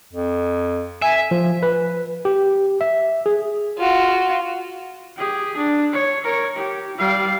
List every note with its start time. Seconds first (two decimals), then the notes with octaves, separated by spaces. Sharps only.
0.13 F2
1.02 E5 G#5
1.31 F3
1.63 B4
2.25 G4
2.81 E5
3.26 G#4
3.78 F4 F#4
5.18 G4 G#4
5.57 D4
5.93 C#5
6.24 A#4 C#5
6.57 G4
6.97 G3 F5